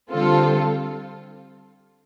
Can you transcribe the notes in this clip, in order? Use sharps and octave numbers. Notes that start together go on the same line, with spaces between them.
D3 G3 C4 F4 A4